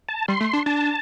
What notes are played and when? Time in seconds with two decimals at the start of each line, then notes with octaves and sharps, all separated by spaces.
0.09 A5
0.28 G3 C6
0.40 A3
0.53 D4
0.66 D4 A5